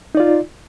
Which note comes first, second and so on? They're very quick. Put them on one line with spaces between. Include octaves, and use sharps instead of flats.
D#4 D5 F4